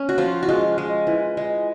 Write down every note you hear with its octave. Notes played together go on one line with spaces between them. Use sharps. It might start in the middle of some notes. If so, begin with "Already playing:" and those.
Already playing: C#4
F#4
F3 F4
F#4
G#3 F4
G#3
E3
G#3